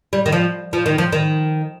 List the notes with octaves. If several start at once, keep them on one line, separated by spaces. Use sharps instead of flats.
G3
D#3
F3
F3
D#3
F3
D#3